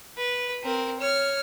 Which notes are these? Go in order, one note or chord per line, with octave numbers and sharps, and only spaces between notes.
B4
C4 A#4
C#5 F6